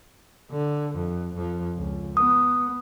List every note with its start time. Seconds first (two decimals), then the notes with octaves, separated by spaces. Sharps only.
0.51 D3
0.95 F2
1.34 F2 F3
1.77 C#2
2.17 B3 D#6